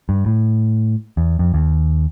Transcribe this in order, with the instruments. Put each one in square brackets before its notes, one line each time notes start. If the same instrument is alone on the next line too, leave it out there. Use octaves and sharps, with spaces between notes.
[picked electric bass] G2
A2
E2
F2
D#2